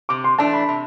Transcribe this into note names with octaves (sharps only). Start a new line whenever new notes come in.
C3 D6
C6
E3 A3 D4 A5
B5
C3